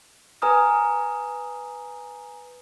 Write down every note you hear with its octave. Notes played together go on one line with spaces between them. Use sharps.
B4 G#5 A#5 D#6 F6